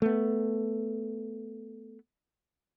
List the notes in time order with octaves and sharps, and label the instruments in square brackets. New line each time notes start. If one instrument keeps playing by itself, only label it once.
[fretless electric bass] A3 B3